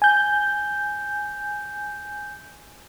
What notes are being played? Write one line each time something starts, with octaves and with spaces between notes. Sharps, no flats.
G#5 G6